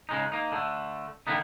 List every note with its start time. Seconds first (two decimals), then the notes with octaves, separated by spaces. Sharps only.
0.09 C#3 G#3 D#4
0.32 A#3 D#4
0.52 D3 A3
1.27 D3 D#3 A#3 B3 D#4